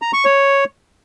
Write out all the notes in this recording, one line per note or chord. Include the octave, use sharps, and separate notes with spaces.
A#5
C#6
C#5